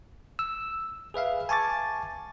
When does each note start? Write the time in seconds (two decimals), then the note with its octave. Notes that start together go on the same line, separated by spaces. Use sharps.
0.39 E6
1.14 G#4 B4 E5 F5
1.49 G#5 A5 C#6 D6 A6